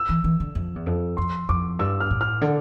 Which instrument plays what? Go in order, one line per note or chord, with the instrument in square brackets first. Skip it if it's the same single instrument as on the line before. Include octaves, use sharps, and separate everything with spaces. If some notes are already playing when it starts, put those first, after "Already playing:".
Already playing: [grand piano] E6
[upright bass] E3
E3
D3
F2
E2
F2
[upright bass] F2 [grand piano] C6
[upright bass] F2 [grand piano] D6
[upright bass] G2 [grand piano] E6
[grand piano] F6
[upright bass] A2
[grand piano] F6
[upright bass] D3